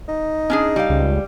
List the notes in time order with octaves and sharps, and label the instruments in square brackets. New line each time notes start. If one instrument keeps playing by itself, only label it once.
[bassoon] D#4
[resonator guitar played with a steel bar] C#4 D4 G#4
G3 F5
[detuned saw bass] C#2